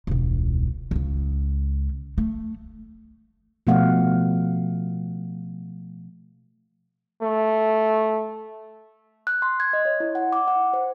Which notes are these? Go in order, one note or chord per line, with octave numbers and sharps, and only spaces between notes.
E1 C#2
C#2 C#3
A3
B2 F3 A3 F5 F#5
A3
F#6
C6
G#6
D#5
C#5
E4
F#5
D6
F#5
C5